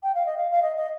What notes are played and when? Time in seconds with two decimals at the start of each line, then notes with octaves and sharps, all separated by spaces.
0.03 G5
0.15 F5
0.26 D#5
0.37 F5
0.51 F5
0.62 D#5
0.77 D#5